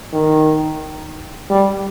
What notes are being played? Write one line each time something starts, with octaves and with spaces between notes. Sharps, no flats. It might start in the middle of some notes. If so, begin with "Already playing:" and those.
D#3
G3